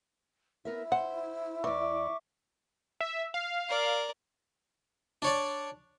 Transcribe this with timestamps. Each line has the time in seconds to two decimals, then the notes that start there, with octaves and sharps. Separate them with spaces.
0.65 B3 E4 A#4 E5
0.92 C5 F#5
1.64 E2 E3 D5 E5 C#6 D6
3.01 E5
3.34 F5
3.69 A#4 D5
5.22 D4 C#5 D5